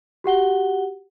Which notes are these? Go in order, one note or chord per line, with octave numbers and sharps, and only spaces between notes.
F#4 G4 F#5 G7